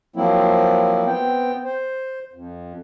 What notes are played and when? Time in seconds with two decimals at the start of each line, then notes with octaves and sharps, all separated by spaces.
0.16 F3 F#3 A#3 C4 E4
1.06 B3 C4 G5
1.64 C5
2.34 F2